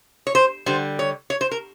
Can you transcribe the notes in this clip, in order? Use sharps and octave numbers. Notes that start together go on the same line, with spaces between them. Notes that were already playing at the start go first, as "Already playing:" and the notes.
C#5
C5
D3 G3 C5
C#5
C#5
C5
A#4